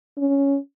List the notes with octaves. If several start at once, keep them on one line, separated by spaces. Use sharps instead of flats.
C#4